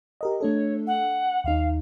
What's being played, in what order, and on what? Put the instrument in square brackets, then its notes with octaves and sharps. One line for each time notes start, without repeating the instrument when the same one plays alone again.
[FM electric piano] G4 A#4 D#5
[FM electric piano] A3 D4 A4 [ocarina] C#5
[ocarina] F#5
[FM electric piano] D#2 D#4 [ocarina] F5